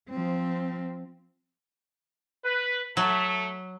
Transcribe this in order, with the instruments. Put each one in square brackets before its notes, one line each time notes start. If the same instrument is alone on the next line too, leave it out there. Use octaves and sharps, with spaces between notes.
[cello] F3 C4
[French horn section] B4
[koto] F#3 [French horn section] A3